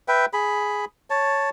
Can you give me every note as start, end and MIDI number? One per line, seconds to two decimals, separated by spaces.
0.08 0.26 71
0.08 0.26 76
0.08 0.26 79
0.33 0.85 68
0.33 0.85 83
1.10 1.50 73
1.10 1.50 81